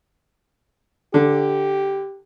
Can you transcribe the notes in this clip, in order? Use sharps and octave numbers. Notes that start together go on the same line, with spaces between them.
D3 G4